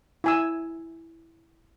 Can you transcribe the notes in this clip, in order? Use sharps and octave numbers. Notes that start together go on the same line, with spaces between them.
E4 G#5 E6